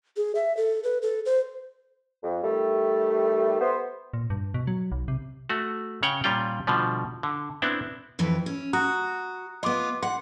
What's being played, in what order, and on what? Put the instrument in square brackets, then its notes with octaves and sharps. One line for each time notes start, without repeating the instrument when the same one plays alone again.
[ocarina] G#4
E5
A4
B4
A4
C5
[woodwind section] F2
D#3 G3 A3
B3 C5
[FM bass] A#2
G2
B2
F#3
B1
C3
[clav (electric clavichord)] A3 F#4
C#3 C#5 F#5 G5
A#2 G3 C#4 F4 G5
B2 D3 F3 G3
D3
B3 C4 D4 E4
[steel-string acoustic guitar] F2 E3 B4
C#4
[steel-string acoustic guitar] F#4 [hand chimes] A#5 D#6 F#6
[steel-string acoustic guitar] B3 F4 [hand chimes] D#5 C6 D6
[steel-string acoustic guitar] F#5 [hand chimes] C6